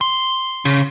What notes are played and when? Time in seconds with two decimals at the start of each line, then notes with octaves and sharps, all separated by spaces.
0.01 C6
0.65 C#3